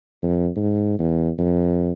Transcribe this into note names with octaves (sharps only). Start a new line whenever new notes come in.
F2
G#2
E2
F2